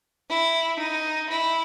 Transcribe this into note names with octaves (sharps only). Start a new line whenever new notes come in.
E4
D#4
E4